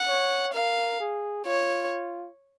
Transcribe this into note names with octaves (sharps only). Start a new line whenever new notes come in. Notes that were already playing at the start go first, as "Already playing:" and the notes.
Already playing: F#5
C#5
A#4 F5
G#4
F4 C#5